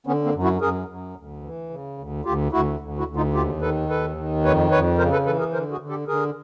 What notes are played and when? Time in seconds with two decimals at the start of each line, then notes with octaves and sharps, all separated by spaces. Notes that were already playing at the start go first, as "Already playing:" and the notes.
0.07 D3 B3 C#4
0.24 A#3 C4
0.34 F#2
0.43 E4 F#4
0.61 F#2 G#4 A#4
0.88 F#2
1.16 D2
1.43 E3
1.70 C#3
1.98 D2
2.25 D2 F4 G4
2.52 D2 E4 F#4
2.80 D2
2.98 E4 F#4
3.07 D2
3.16 D#4 F4
3.34 D#2 F4 G4
3.61 D#3 A4 B4
3.89 D#2 A4 B4
4.16 D#3
4.44 F2 B4 C#5
4.71 F2 B4 C#5
4.98 C#3 A#4 C5
5.12 A4 B4
5.26 E3 A4 B4
5.39 G#4 A#4
5.53 D3 A#4 C5
5.71 F#4 G#4
5.80 D3
5.89 G4 A4
6.08 D3 G#4 A#4